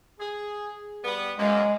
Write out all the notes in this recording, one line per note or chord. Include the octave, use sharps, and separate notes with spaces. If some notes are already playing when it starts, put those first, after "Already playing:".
G#4
G3 B3
F#2 G#3 A#3